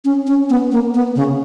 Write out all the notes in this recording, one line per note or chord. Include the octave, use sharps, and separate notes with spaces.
C#4
C#4
B3
A#3
B3
C#3